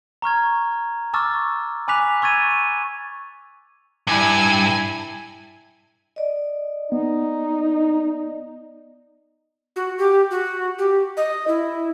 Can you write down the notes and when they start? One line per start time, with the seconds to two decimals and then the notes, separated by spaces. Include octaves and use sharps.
0.22 A#5 C#6 F6 G#6
1.14 A5 C#6 D6 E6 F6 A6
1.88 G#5 B5 D6 F#6 B6 F7
2.22 C#6 E6 G#6 A6 D#7
4.07 G2 E4 G#5
6.16 D5 D#5
6.92 B3 D#4
9.76 F#4
9.98 G4
10.31 F#4
10.79 G4
11.17 D#5
11.48 E4